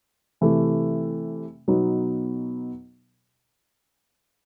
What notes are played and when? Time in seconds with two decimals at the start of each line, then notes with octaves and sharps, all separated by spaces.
0.41 C3 E3 A3
1.68 B2 F#3 B3 D#4